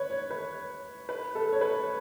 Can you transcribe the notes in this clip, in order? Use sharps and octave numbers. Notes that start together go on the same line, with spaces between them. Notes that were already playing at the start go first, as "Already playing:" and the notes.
Already playing: B4 C#5
C#5
B4
B4
A4
C#5
B4